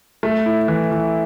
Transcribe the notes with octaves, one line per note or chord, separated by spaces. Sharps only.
A3
E4
E3
E3